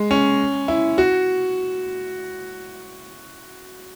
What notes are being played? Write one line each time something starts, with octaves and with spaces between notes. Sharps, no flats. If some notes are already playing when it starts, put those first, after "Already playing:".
Already playing: G#3
C#4
E4
F#4